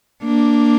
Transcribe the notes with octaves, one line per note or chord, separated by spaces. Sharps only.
A#3 D4